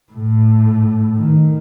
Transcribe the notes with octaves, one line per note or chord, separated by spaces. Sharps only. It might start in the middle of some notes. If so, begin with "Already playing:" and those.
A2
D#3